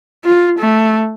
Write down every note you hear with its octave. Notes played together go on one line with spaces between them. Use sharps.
F4
A3